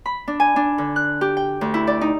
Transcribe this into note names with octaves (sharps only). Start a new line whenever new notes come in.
B5
D4
G#5
D4
D3
F#6
G4
G5
D2
E4
D5
D#4